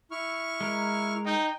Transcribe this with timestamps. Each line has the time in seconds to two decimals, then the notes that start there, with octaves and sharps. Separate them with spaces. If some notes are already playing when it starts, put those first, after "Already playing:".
0.11 E4 C#6 F6
0.61 G#3 A#4
1.25 D#4 G5